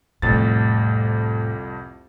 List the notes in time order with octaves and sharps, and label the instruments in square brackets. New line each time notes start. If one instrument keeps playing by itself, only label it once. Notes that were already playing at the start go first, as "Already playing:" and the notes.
[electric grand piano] C2 F2 A6 [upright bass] A2